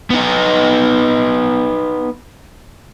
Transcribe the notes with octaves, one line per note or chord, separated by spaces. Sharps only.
B3 D#4